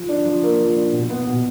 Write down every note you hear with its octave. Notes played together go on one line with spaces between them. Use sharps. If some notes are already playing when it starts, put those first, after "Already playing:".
Already playing: F3
D4
F3
A#3
F3
D4
B2
B3
B2